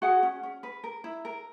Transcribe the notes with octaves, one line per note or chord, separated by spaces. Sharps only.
F#4 G#4 F#5
C#4
C#4
B4
A#4
E4
A#4